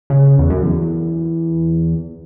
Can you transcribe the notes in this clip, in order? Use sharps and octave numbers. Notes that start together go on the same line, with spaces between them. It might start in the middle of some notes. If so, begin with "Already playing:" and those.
C#3
E2
F#2
E2